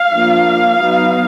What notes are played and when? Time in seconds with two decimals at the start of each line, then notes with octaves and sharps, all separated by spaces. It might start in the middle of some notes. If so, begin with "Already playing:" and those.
Already playing: F5
0.12 F3 A#3 D4
0.79 F#3 B3 D#4